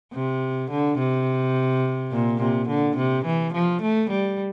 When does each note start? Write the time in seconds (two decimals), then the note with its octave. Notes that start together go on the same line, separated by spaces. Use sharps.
0.13 C3
0.70 D3
0.98 C3
2.12 A#2
2.39 C3
2.68 D3
2.97 C3
3.25 E3
3.54 F3
3.82 A3
4.10 G3